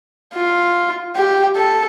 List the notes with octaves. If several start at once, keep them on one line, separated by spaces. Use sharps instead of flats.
F4
G4
A4